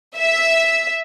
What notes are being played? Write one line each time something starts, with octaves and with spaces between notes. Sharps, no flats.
E5